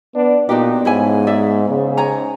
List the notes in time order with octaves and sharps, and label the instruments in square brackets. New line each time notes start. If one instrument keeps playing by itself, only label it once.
[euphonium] B3 [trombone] D4
[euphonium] A#2 [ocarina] B3 [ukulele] D4 F#4 G4 [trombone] D#4
[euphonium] G#2 [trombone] C#3 [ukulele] E4 A4 G#5
[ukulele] G#4 D5 E5
[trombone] G#2 [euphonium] C#3
[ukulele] C#5 G#5 A#5